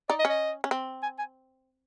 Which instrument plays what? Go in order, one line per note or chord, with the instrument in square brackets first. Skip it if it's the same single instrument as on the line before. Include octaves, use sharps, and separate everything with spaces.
[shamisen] D#4 [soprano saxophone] D5
[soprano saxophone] D#5
[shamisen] C#4
[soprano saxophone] D#5
[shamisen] C#4
C4
[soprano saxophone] G#5
G#5